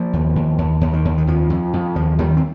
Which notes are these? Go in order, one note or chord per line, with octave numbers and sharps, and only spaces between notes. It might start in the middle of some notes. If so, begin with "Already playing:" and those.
Already playing: F3 A#3
D#2
D#2
D#2
D#2
D#3
D#2
D#3
F2 F3
F2
F2
D#2 F3
D#2 D#3 G3
C4